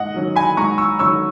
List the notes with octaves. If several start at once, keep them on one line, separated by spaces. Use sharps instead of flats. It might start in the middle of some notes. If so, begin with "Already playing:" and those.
Already playing: G#2 D#5 F#5
D#3 F#3 C#4
G#5 B5
G#2 A#5 C#6
C#6 E6
D#3 F#3 C#4 C#6 E6